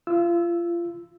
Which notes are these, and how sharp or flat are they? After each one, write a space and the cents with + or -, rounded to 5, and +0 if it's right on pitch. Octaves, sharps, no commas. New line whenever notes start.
F4 -30 E6 +0